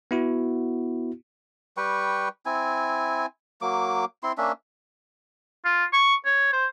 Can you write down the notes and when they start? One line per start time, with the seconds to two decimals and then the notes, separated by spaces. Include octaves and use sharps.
0.11 B3 E4 F#4
1.77 G3 B4 G5 C#6
2.46 C4 E4 G#5
3.62 F#3 A#3 D6
4.23 C4 E4 C6
4.38 A#3 C#4 D4 E5
5.65 F4
5.93 C#6
6.25 C#5
6.53 C5